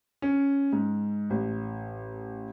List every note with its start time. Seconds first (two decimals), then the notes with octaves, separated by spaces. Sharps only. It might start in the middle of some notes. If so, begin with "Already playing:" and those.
0.22 C#4
0.72 G#2
1.30 A1